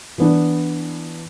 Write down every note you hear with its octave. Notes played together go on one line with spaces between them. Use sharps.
E3 B3 D4